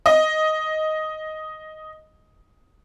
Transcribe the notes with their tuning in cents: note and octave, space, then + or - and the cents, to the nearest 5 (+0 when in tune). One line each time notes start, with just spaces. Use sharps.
D#5 +5